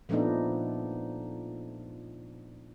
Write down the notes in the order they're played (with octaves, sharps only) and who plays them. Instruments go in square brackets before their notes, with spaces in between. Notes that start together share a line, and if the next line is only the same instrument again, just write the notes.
[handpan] A#2 F3 A3 B3 D4 D#4